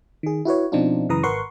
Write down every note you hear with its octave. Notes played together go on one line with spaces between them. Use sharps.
D#3 G#4
E4 F#4 B4 C#5
B2 F3 C4 D4 D#4 F4
F#2 C#3 E3 B4 A#5 D#6
G#1 A#4 B4 F#5 C6 C#6